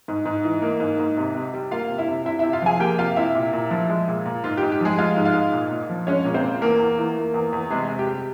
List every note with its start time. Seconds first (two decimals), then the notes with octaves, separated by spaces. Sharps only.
0.08 G#2
0.25 G#2
0.44 E3
0.62 A#3
0.80 G#2
0.99 G#2
1.17 C3
1.35 C3
1.54 G3
1.71 A#3 F4 F5
1.89 C3
1.98 E4 E5
2.08 C3
2.25 C3 E4 E5
2.39 C3 E4 E5
2.53 F4 F5
2.62 F3 G#4 G#5
2.80 A#3 G4 G5
2.98 C3 F4 F5
3.16 C3 E4 E5
3.35 A#2
3.53 A#2
3.71 F3
3.89 G#3
4.08 A#2
4.26 A#2
4.44 G#2 F4
4.57 G#2 G4
4.72 G4
4.81 F3 G#3 G#4
4.98 G#3 F4 F5
5.16 G#2
5.25 F4 F5
5.34 G#2
5.53 A#2
5.71 A#2
5.90 F3
6.07 G#3 C#4 C#5
6.25 A#2
6.34 C4 C5
6.44 A#2
6.62 E2 A#3 A#4
6.80 E2
6.98 E3
7.17 A#3
7.34 E2
7.53 E2
7.71 C3 G#3 G#4
7.89 C3
7.99 G4
8.07 G3